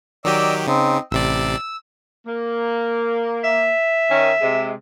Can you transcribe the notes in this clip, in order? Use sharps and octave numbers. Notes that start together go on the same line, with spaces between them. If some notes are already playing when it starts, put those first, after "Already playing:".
D#3 F#3 G4 D5 D#5 E6
C#3 C4 D#4
A1 C3 D5 E6
A#3
E5
D#3 C#4
C3 G#3